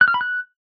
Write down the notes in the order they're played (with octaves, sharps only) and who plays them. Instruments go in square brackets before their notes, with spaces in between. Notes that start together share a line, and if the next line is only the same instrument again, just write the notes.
[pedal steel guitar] F#6
F6
B5
F#6